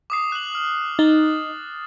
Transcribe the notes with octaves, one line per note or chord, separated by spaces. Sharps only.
D6 D#6 C7
F#6 F#7
F6
D#4 A6